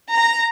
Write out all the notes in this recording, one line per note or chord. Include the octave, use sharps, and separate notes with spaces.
A#5